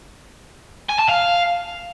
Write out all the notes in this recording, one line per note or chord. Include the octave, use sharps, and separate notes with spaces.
G#5
A5
F5